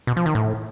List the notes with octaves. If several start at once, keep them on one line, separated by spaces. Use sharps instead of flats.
B2
F3
D#3
A2